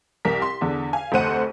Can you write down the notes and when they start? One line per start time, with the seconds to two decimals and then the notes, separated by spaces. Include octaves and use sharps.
0.25 C2 A#4 B6
0.42 C6
0.61 E2 D3
0.93 F5 G#5
1.12 F1 D2 A3 C5 F#5 D#7